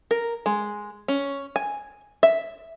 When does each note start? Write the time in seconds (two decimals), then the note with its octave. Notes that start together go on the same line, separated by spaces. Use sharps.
0.11 A#4
0.46 G#3
1.08 C#4
1.56 G#5
2.23 E5